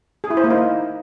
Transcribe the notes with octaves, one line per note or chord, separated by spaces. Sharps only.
G#4
E4
C5
A#3
D#4